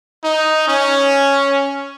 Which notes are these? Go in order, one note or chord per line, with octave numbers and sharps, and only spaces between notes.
D#4
C#4